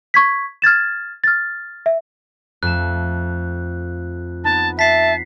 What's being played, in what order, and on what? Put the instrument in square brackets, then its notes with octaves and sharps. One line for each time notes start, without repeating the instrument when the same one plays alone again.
[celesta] C#6 G#6 B6
F6 G#6 A6 E7
F6 A6
E5
[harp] F2 A3 E7 [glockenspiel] F#6
[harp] B3 D#4 [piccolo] A5
[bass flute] E5 [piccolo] A5 [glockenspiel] B6 C7